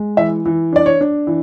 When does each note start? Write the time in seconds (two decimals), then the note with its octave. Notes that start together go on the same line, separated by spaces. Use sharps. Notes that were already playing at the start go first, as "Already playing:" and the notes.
Already playing: G#3
0.17 E3 E5
0.46 E3
0.73 D4 D5
0.86 C#5
1.01 D4
1.27 E3